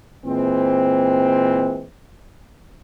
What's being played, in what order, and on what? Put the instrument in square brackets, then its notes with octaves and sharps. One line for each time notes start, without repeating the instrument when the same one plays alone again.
[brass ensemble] A#2 E3 G#3 C4